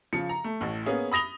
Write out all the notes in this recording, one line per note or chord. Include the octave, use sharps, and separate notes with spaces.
C#3 F3 C#7
A#5
A3
A1 A2
A#3 B3 C#4 G#4
B5 D#6 A#6 F7 G7